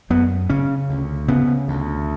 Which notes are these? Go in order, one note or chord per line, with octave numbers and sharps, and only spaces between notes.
F#2 B3
C#3 C#4
D2
C#3 B3
D2